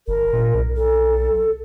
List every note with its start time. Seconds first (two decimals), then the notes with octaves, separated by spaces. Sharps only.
0.08 G1 A#4
0.33 A#2
0.54 B1
0.76 A4